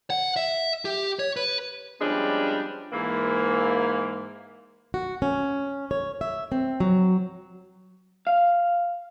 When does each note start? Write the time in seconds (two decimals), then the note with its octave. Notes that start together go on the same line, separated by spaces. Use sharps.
0.10 F#5
0.36 E5
0.85 G4
1.19 C#5
1.37 B4
2.01 F3 G3 G#3 B3 C#4 D4
2.92 G#2 E3 A#3
4.94 F#4
5.22 C#4
5.91 C#5
6.21 E5
6.52 C4
6.80 F#3
8.27 F5